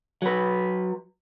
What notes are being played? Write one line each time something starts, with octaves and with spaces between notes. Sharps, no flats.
F#3 B4